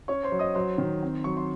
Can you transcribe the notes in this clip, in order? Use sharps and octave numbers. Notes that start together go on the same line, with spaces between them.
C#4 C#5 C#6
C5 C6
F#3
D#5 D#6
F#3 C5 C6
D#3
C4
F#3 C#6
C6